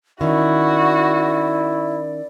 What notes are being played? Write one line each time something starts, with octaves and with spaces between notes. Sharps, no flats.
D#3 C#4 E4 F#4 D5